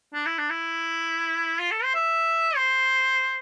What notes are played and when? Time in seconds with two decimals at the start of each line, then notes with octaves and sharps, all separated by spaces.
0.14 D4
0.26 E4
0.38 D4
0.50 E4
1.59 F4
1.71 A4
1.83 C5
1.95 E5
2.56 C5